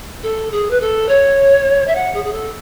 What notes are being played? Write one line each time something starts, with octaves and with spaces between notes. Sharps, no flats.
A4
G#4
B4
A4
C#5
E5
F#5
G#4
G#4
A4